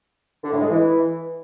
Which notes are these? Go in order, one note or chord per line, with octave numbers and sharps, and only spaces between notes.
D3
A2
G#3
E3